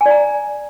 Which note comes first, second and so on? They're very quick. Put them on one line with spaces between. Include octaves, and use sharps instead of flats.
G#5 D5 A#5